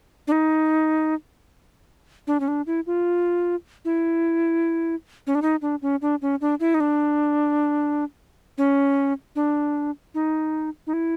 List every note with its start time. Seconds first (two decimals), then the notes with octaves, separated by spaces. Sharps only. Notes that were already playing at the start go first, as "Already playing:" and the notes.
0.27 D4
0.32 D#4
2.27 D4
2.40 C#4
2.48 D4
2.67 E4
2.87 F4
3.85 E4
5.27 C#4
5.35 D4
5.42 D#4
5.62 D4
5.82 C#4
6.02 D4
6.22 C#4
6.41 D4
6.60 E4
6.74 D#4
6.80 D4
8.58 C#4
9.36 D4
10.14 D#4
10.87 D#4
10.93 E4